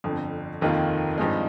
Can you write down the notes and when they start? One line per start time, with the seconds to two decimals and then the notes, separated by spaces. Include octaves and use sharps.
0.04 G1 F2 D3
0.61 F1 D#2 D#3 A#3 F4
1.18 G#1 G2 F3 G#3 D#4